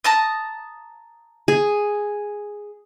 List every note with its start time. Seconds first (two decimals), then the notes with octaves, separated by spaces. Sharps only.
0.04 A5 A#5 D#6
1.48 G#4